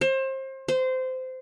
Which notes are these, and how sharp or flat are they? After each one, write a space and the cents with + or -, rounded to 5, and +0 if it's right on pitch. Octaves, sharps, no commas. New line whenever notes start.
C5 +30
C5 -20